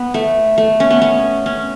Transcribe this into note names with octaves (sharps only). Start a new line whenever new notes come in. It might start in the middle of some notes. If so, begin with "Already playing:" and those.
Already playing: B3
A3
A3
C#4
B3
C#4
C#4